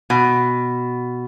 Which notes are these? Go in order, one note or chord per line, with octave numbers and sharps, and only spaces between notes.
B2